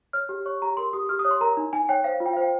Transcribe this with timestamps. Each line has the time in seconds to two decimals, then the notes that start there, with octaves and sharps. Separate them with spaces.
0.13 C#5 F6
0.29 G4
0.46 C#5 C#6
0.62 G4 A#5
0.77 A#4 C6
0.93 G4 D#6
1.09 G4 F6
1.19 D#6
1.25 C#5
1.31 C6
1.41 A#4 A#5
1.57 D#4
1.73 D#4 G#5
1.89 C#5 G5
2.04 C5 F5
2.20 F4
2.26 G5
2.33 F5
2.37 C5
2.42 G5